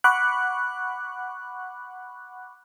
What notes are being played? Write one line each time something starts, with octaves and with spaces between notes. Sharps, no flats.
F#5 B5 C#6 D6 F#6